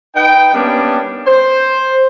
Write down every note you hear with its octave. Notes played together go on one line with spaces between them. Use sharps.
D#4 B4 G5
G3 A#3 B3 C#4 D4
C5